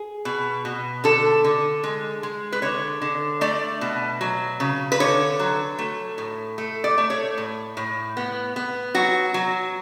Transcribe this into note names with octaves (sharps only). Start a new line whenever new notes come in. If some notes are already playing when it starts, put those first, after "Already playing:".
Already playing: G#4
B2
B2
D3 A4
D3
G#3
G#3
B4
D3 C#5
D3
A3 D5
B2
F#3
C#3
B4
D3 C#5
F#3
A3
A2
A3
D5
A3
C#5
A2
A2
B3
B3
F#3 F#4
F#3